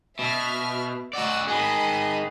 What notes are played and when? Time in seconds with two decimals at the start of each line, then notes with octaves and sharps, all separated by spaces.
0.19 B2 E5 F6
1.13 F#4 D5 D#5 F#5 E6
1.48 D#3 G#4 D#5 B5